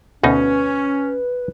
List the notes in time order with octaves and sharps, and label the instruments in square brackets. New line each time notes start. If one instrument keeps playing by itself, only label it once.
[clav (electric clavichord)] D2 B2 D#4 [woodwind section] C#4 [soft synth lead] B4